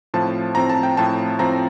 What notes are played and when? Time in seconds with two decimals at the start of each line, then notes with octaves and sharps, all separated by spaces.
0.14 A2 F3 C4 A5
0.55 A2 F3 C4 A#5
0.70 A5
0.83 G5
0.97 A2 F3 C4 A5
1.39 A2 F3 C4 A#5